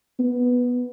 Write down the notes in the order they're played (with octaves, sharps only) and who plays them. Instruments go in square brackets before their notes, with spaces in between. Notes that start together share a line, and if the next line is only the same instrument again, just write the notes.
[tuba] B3